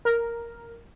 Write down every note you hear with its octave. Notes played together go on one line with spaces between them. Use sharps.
A#4